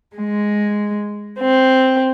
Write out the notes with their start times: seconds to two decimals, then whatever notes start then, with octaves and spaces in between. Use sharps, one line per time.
0.16 G#3
1.39 C4